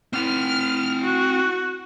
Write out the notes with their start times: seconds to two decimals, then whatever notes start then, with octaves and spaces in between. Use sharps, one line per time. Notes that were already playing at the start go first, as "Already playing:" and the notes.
0.13 C4 E4 F#5 F6
1.02 F#4